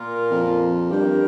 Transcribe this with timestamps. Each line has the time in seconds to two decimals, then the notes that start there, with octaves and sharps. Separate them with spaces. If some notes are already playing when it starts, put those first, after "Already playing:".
Already playing: A#2 A#3 F4 A#4
0.31 F2
0.91 G2 G3 D4 G4 A#4